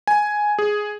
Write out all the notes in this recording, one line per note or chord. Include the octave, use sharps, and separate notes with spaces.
G#5
G#4